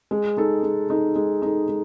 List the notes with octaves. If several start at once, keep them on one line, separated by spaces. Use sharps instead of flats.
G#3
D#4 A4
G#3
D#4 A4
G#3
D#4 A4
G#3